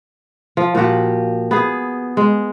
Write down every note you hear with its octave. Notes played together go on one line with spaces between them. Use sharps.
F3
A#2 F3 F#4 G4
B3 G#4
G#3